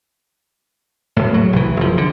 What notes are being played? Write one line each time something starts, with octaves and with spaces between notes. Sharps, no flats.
E1 A2
F#3
C2 E3
F#1 F3
D3